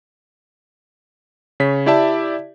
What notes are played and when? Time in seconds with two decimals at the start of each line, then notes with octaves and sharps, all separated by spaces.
1.60 C#3 C#5 B6
1.86 E4 G4 D5 E5 A5